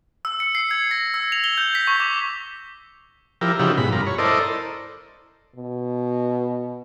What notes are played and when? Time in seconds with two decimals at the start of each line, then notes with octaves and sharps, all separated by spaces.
0.25 E6
0.40 C#7
0.55 C7
0.71 G#6
0.91 A#6
1.14 E6
1.32 F7
1.44 G7
1.58 G6
1.75 B6
1.87 C#6
2.00 D6
3.41 F3 E4 G4 A#4
3.59 C#3 F3 D#4 E4 F#4 G4
3.77 G#2 B2 B5
3.92 G2 F4 A#4
4.07 C#5
4.18 E4 A4 A#4 C5 D5 D#5
5.56 B2